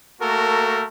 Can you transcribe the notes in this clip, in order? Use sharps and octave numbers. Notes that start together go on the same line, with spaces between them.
A3 A#3 F#4 A4 A#4